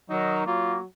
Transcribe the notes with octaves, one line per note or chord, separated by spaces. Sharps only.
D#3 F#3 D#4
F#3 A#3 F4